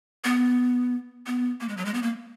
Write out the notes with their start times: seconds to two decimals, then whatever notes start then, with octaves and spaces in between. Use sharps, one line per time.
0.24 B3
1.27 B3
1.60 A#3
1.69 G#3
1.77 F#3
1.85 G#3
1.94 B3
2.03 A#3